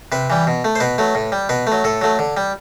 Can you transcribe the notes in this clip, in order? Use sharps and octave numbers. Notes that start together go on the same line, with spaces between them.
C3 B4
E3 G3
B2
A3
C5
B2 B4
F#3 A3
A2
G3
B2 B4
A3
F#3
A2 A4
F#3 A3
D3
G3